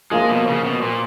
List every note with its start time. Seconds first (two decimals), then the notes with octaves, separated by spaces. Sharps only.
0.11 F3 G#3 A#3 F4
0.29 B2
0.47 C#3
0.65 B2
0.82 A#2